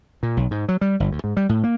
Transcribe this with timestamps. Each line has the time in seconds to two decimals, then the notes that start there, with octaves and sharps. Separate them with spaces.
0.23 A#2
0.37 B1
0.51 G#2
0.68 F#3
0.81 G3
1.00 G1
1.12 D2
1.24 G#2
1.37 G3
1.49 A2
1.64 A#3